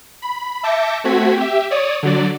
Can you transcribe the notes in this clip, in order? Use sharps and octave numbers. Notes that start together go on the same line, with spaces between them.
B5
E5 A5 D6 G6 A#6 C#7
A3 C4 F#4 G#6 B6
G4 E5
C#5 D5 D#6
D3 F#3 D5